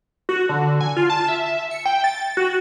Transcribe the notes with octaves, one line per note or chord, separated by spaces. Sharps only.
F#4
D3
G#5
F4
A5
E5
C#7
G5
A6
F#4